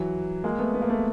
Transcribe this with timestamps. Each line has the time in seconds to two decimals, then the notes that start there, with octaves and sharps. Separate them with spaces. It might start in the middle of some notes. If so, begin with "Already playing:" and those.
Already playing: E3 F#3
0.44 G#3 A#3
0.58 A3 B3
0.74 B3
0.82 A#3
0.89 A3 B3